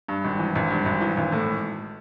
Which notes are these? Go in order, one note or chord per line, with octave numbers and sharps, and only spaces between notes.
G2
G#1
E3
G#1
G2
G#1
E3
G#1
A2